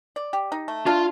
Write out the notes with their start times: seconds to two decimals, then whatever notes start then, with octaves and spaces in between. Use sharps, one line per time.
0.16 D5
0.33 G4
0.52 D#4
0.68 A3
0.86 D4 F4